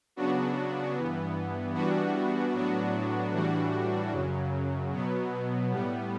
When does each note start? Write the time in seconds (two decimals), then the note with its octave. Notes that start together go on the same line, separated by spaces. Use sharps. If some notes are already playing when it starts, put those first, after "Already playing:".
0.16 C#3 F#3 B3 D4 F#4
0.95 G2 E3 B3
1.74 E3 G3 B3 D4 F#4
2.53 A2 F#3 B3 D4 F#4
3.32 A2 E3 G3 D4 F#4
4.12 F#2 C#3 F#3
4.91 B2 F#3 B3
5.71 A2 G3 B3